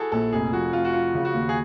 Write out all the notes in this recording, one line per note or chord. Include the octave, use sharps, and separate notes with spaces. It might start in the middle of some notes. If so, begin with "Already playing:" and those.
Already playing: E4 F#4 G#4 A4
A#1 A4
F1 G#4
F3 F#4
F1 F4
F#4
F3 F4
C#3
F#4
D#2
G#4